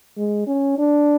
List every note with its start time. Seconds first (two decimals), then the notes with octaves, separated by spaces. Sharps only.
0.17 G#3
0.47 C#4
0.78 D4